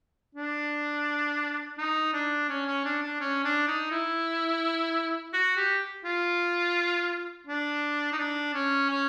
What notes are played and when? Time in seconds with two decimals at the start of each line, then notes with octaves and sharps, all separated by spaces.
0.35 D4
1.78 D#4
2.13 D4
2.49 C#4
2.67 C#4
2.84 D4
3.02 D4
3.20 C#4
3.44 D4
3.67 D#4
3.91 E4
5.33 F#4
5.57 G4
6.05 F4
7.46 D4
8.12 D#4
8.17 D4
8.53 C#4
8.89 C#4